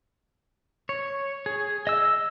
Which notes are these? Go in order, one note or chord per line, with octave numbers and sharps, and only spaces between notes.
C#5
G#4
D#5 E6